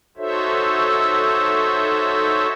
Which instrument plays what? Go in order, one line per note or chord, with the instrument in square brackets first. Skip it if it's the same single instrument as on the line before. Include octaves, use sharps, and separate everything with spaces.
[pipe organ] D#4 F#4 A4 C5 C#5 E5